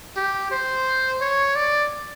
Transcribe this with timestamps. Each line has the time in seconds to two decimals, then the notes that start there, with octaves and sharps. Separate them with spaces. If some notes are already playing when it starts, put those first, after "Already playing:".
0.17 G4
0.51 C5
1.21 C#5
1.55 D5